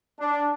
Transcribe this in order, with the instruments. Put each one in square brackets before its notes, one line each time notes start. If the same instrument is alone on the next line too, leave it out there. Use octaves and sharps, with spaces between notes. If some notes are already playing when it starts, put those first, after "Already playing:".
[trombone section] D4